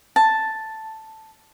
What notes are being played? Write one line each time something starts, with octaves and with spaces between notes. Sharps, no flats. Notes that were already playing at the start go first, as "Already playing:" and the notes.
A5